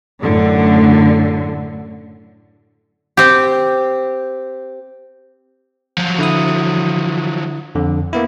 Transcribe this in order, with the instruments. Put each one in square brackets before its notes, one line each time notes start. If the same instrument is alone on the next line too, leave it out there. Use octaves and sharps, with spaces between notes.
[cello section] F#2 A2 D3
[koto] C4 G4
[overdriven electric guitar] F3 F#3
[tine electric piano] D3 E4 D#6
F2 D3
A#3 B3 E4